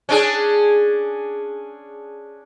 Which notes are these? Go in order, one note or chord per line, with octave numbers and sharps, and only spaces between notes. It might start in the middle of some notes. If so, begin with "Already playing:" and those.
C#4 D4 G#4